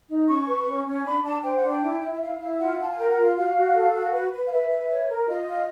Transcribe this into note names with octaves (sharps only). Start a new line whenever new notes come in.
D#4
C#4 C#6
B4
C#4
C#4
D4 B5
D4 A5
C5 G5
F#5
D4
G5
E4
E4
E5
E4 F5
E4
F4 F#5
F4 A5
G#5
A#4 G5
F#5
F4
F5
F#4 F5
F#4
A4
F#4
B4
B4
F5
B4 E5
B4
C#5
A#4
F4 D#5
F4